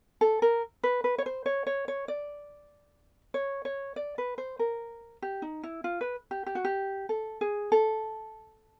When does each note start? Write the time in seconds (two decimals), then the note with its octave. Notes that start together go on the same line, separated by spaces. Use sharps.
0.21 A4
0.42 A#4
0.84 B4
1.04 B4
1.18 C#5
1.26 C5
1.46 C#5
1.67 C#5
1.88 C#5
2.08 D5
3.34 C#5
3.65 C#5
3.96 D5
4.18 B4
4.38 C5
4.59 A#4
5.22 G4
5.42 D#4
5.63 E4
5.84 F4
6.01 B4
6.31 G4
6.46 G4
6.55 F#4
6.65 G4
7.09 A4
7.41 G#4
7.72 A4